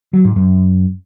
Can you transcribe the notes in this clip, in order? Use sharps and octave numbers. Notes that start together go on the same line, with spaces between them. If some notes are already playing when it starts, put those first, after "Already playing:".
F#3
G#2
F#2